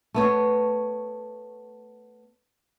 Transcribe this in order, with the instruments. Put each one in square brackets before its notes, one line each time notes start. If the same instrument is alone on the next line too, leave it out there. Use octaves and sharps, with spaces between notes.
[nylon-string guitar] A3 B3 C#5